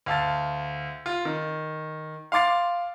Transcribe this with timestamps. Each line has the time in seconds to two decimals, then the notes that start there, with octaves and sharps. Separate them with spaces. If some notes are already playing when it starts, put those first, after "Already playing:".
0.06 D2 F5 A5 A6
1.06 F4
1.25 D#3
2.32 F5 C6 D6 A6 C7